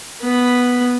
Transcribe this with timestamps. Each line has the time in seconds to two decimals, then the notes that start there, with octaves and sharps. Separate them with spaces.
0.22 B3 B5